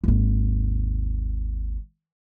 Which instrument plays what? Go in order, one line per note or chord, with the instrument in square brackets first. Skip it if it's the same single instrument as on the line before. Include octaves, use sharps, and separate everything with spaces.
[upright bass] G#1 D#2